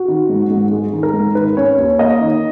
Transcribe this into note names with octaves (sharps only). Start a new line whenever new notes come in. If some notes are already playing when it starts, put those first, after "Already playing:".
Already playing: F#4
D#3
G#2
G#2
G#3
D#3
A#4
G#2
D#3 B4
C#4 C#5
D#2 C#5
A#3 D#5
D#3